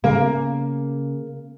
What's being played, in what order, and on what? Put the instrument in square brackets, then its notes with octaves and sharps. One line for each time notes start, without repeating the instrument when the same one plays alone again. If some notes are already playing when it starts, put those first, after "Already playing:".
[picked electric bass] C#3 [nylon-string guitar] A#3